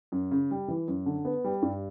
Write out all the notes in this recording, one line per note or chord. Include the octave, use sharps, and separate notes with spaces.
F#2
C#3
G3
E3
F#2
D3
B3
G3
G2